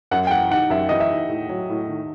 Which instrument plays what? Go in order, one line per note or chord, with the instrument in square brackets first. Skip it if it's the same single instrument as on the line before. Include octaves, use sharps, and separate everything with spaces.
[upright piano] F#2 [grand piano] F#5
[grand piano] G5
[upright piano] E3 [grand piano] F#5
[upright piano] D#4 [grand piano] F#5
[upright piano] F#2 [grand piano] E5
[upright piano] E3 [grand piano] D#5
[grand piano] E5
[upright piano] D#4
A2
F#3
A2
D#3